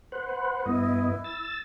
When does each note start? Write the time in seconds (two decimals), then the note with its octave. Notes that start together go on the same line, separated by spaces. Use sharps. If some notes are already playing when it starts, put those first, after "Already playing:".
0.12 B4 C5 F#5
0.66 G2 B3 E4 D#5
1.24 E6 A6